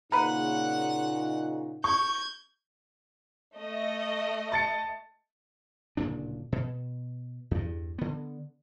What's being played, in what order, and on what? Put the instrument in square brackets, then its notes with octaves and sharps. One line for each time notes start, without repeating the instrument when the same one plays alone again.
[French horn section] A#2 C#3 D#4 [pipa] A#4 B4 [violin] F#5 F#6
[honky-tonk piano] C#6 [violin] G6 G#6
[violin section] A3 D#5
[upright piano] A5 A6 C#7
[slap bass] D1 A#2 C#3 D4
B2
E2 G2
D3 B3